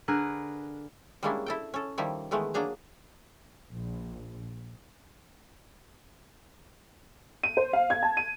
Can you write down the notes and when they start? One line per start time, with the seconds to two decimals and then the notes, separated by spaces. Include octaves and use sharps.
0.08 D3 G#4 A#4 B4
1.23 G3 G#3 A#3 C#4 D4 E4
1.46 E4 A4 G5
1.74 C#4 A4
1.98 D#3 F3 G3 E4 G4
2.31 D#3 E3 G#3 A3 B3
2.54 F#3 A#3 D4 G#4 A#5
3.70 A#1
7.43 D#7
7.57 C5
7.73 F5
7.90 G#6
8.03 A5
8.17 D#7